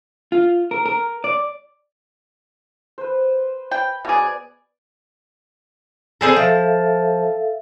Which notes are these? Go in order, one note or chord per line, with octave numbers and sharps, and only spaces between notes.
F4
A#4
A#4
D5
B4 C5
G5 B5
B2 B3 G#4 D5
C4 G#4 A4
F3 A4 E5 F5